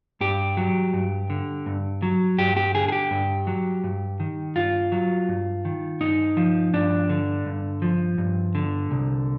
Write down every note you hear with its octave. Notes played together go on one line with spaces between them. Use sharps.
G2 G4
F#3
G2
D3
G2
F#3
G2 G4
G4
D3 G#4
G#4
G4
G2
F#3
G2
D#3
G2 F4
F#3
G2
D#3
G2 D#4
F3
G2 D4
D3
G2
F3
G2
D3
C2